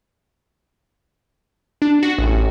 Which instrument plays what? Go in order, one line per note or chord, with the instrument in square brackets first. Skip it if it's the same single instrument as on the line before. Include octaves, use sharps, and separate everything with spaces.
[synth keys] D4
F#4
A1